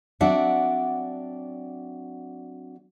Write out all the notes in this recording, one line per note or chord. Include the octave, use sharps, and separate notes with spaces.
F#3 C4 D4 D5 E5 F#5